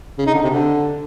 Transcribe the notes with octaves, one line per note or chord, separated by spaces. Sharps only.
C#3
D#4
D3
C3
D3